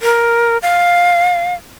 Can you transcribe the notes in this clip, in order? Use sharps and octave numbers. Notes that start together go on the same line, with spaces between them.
A#4
F5